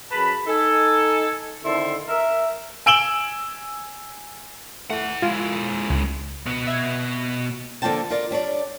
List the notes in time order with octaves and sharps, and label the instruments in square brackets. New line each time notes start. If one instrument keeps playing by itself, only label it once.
[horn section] F#2 G#4 B4 A5 B5
D#4 A4 G#5
D3 D#3 C4 E4 A4 C6
A#4 E5
[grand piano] G#5 E6 D7 E7 F#7 G7
[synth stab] A3 [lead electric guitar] E4 F#5
[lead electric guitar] G#3 E4 [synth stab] F4
[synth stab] C#2
[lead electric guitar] B2 B3
[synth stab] E5 G#6
[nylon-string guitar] D3 F3 A#3 F4 G5 A5
F4 A#4 D5
G3 D4 C#5 D5